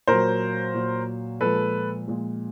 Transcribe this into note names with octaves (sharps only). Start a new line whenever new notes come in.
A#2 F#3 A#4 C5
A#2 F#3
A#2 F3 G#3 A4 B4
A#2 F3 G#3